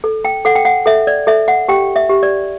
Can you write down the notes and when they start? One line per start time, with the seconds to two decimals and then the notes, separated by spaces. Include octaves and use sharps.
0.04 A4
0.25 G5
0.45 A4 F#5
0.55 G5
0.65 F#5
0.86 A4 E5
1.07 D5
1.27 A4 E5
1.48 F#5
1.68 G4 G5
1.96 E5
2.09 G4
2.23 D5